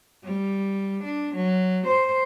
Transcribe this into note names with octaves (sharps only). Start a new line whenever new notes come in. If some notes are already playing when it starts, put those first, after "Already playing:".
G3
D4
F#3
C5